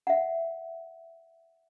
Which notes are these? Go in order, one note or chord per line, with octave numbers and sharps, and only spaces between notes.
E5 F#5